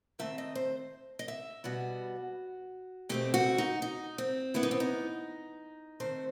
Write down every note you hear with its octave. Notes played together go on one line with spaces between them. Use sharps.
D#3 A3 C4 E5
D#5
C5
D#5
E5
B2 G3 B3 F#4
B2 A3 C4 G4
F#4
D#4
D#4
C4
E3 B3 E4
D#4
C4
D#4
D#3 A3 C4 C5